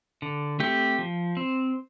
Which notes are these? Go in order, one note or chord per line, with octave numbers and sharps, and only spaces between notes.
D3
A3 C4 G4
F3
C4